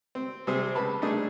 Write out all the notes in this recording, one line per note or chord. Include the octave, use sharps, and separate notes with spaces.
C4
C3 G3 C4 G#4 C5
C#2 B4 A5 B5
G3 A3 A#3 D4 D#4 G#4